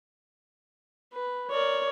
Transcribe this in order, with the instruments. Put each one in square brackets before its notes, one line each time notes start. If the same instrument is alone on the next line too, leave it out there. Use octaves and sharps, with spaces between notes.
[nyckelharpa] B4
[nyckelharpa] A#4 D5 [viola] C#5